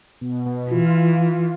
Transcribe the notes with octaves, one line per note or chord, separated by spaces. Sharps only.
B2
B2
E3 F4